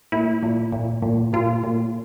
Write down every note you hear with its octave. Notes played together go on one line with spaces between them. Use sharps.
A#2 E4
A#2
A#2
A#2
A#2 F4
A#2